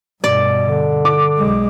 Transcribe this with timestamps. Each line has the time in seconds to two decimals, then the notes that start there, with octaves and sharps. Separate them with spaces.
0.24 G2 B2 D5
0.64 D3
1.05 D6
1.37 B1 G#3